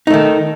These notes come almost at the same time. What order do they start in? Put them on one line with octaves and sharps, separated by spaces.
D#4 A3 D#3